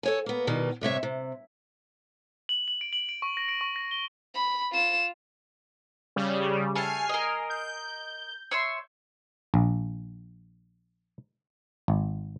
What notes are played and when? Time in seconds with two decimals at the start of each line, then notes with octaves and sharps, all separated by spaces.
0.03 A4 C#5 G#5
0.26 A#3 B3
0.47 B2 D#3 G3
0.81 G2 C3 C#5 E5
1.03 C3
2.49 F#7
2.68 F#7
2.81 D7
2.93 F#7
3.09 D7
3.22 C#6
3.37 A#6
3.49 D7
3.61 C#6
3.76 A#6
3.91 G7
4.35 B5
4.72 F4 E7
6.16 C#3 G3
6.75 A3 G#5 A5 F6 C7
7.09 A#4 D#5
7.50 G6
8.51 C#5 E5 C6
9.54 A#1
11.88 G#1